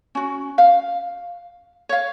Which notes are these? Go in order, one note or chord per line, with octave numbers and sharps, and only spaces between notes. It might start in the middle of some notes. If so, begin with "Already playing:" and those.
C#4 F#4
F5
C#5 F5